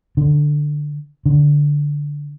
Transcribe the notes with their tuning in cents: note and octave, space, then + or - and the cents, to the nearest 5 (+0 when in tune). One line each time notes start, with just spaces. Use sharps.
D3 +10
D3 -5